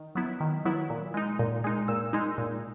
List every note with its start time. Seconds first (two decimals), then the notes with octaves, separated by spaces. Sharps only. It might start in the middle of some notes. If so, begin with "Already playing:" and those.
Already playing: D#3
0.15 F#3 B3 E4
0.40 D#3
0.65 F#3 B3 E4
0.90 A#2
1.14 G#3 D#4
1.39 A#2
1.64 G#3 D#4
1.88 A#2 E6
2.13 G#3 D#4
2.38 A#2